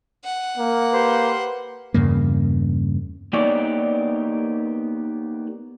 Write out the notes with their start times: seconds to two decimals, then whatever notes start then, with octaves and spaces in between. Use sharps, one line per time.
0.25 F#5
0.57 A#3
0.93 G4 B4 C5 C6
1.94 E2 G2 C#3 A#3
3.33 A#3 B3 D#4 G4 C#5 D5